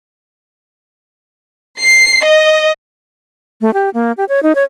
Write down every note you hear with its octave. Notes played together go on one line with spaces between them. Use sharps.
C7
D#5
A3
G4
A#3
G4
C#5
D#4
C#5